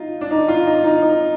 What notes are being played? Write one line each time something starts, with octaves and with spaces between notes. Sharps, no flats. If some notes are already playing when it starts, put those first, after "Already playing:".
Already playing: D#4 F4
D4
D#4
F4
D#4
D#4
D#4